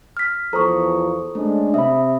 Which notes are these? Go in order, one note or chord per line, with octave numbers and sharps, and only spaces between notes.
F6 B6
E2 F3 A4 C5 A#5 C#6 D#6
G#3 A3 C#4 D4
C3 E5 B5 D#6